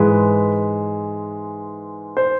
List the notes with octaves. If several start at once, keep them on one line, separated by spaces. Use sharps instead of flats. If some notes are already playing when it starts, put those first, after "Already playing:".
Already playing: G#2 E3 G#3 B4
C5